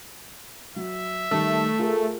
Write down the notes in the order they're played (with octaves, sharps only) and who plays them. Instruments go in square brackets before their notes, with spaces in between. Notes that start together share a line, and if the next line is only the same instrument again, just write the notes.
[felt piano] F#3 [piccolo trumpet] E5
[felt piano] D#3 G3 [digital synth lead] A3
[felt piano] F4 G#4 A#4